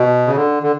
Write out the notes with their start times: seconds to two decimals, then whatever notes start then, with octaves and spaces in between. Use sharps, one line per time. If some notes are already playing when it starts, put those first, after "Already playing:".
Already playing: B2
0.27 C#3
0.36 D3
0.63 D3